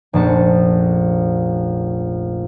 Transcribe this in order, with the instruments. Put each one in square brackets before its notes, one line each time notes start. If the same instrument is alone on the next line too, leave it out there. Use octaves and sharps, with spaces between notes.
[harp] F1 A#1 A5 C#7